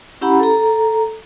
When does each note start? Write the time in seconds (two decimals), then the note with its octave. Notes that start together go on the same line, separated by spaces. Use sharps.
0.21 C#4 E4 G4 F#5 A#5 B5
0.40 A4 A#5